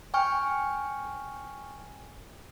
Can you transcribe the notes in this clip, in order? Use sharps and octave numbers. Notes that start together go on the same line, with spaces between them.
G5 G#5 C#6 F6